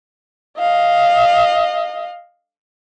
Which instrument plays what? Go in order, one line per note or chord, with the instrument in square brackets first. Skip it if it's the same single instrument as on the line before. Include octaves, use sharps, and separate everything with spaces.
[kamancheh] D#5 F5